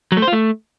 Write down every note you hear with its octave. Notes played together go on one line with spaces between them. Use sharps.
F#3
A3
C5
F4
A3